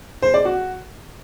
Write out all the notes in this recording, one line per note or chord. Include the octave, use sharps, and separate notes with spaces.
C5
D5
F#4